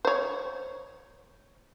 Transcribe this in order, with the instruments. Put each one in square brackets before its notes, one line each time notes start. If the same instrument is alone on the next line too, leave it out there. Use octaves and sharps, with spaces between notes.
[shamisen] C5 C#5